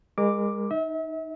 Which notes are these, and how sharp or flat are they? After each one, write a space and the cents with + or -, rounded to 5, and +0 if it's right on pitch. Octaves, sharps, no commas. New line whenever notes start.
G#3 -30 A#4 +0 D6 +0
D#4 +0 E5 -40